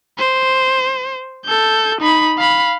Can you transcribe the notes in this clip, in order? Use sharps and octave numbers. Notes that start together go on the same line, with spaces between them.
C5
A4 G6
D#4 B5
F5 B5